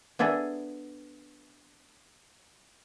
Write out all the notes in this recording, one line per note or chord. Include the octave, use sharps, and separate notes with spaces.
B3 D4 E4 G#4 A4